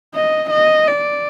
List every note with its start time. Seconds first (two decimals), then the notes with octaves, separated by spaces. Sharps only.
0.15 D#5
0.50 D#5
0.87 D5